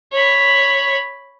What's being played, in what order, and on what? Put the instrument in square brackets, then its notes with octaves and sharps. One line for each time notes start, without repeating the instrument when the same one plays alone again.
[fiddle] C#5 B5